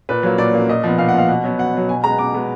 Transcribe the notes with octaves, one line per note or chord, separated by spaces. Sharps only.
A#2 B4
F#3 A#3
A#2 D5
F#3 A#3
A#2 D#5
F3 B3
A#2 F5
F#5
F3 B3 F5
B2 F#5
F#3 B3
B2 F#5
F#3 B3
B2 G#5
G#3 B3 A#5
B2 D6
G#3 B3